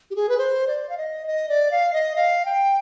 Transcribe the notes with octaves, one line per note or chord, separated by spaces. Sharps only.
G4
G#4
B4
C5
D5
F5
D#5
D#5
D5
F5
D#5
F5
G5